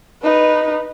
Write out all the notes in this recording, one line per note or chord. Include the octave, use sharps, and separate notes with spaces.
D#4 B4